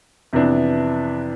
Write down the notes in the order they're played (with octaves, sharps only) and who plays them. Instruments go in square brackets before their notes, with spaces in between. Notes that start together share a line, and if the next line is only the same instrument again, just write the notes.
[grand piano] F2 C3 E3 B3 D4